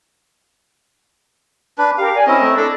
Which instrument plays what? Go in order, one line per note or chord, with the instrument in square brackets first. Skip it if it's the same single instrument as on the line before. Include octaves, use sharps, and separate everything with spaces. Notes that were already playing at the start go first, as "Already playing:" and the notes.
[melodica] D4 B4
[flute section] G4 A#4 [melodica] F5
[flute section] D5 G#5
[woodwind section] C4 D#5 [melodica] C#4 [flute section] E4 A#4
[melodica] A3
[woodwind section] D4 [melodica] A4